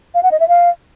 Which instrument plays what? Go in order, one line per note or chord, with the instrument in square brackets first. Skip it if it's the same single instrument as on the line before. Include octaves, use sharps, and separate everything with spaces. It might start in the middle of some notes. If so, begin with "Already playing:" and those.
[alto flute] F5
F#5
D#5
E5
F5